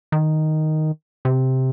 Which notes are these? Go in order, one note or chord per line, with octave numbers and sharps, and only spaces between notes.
D#3
C3